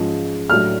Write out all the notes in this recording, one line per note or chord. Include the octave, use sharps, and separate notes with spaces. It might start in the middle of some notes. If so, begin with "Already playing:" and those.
Already playing: G#2 F3 G#3 C#4
A2 F#3 A3 D4 F6